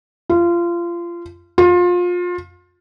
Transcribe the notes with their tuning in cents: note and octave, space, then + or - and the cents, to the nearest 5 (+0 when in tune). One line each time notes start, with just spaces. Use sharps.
F4 -25
F4 +25